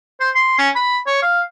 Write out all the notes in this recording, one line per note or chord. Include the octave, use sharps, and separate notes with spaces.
C5
C6
C#4
B5
C#5
F5